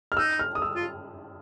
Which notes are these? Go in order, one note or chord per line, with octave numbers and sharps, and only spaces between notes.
F6
D#4 E6
F6
D#6
E6
F4